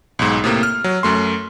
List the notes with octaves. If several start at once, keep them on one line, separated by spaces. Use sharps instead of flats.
B1 G#2
A2 C3 A#3
F6
F#3
F#2 A3 C6